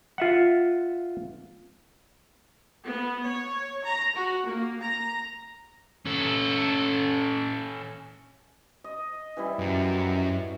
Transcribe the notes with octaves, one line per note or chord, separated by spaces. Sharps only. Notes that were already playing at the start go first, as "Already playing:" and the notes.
F4 E5 F#5
B3
C#5
A#5
F#4
A#3
A#5
C#4 A4
D#5
E3 G3 E4
F#2 F#3